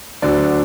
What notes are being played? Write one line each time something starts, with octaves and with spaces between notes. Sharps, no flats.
D2 D3 F#3 D5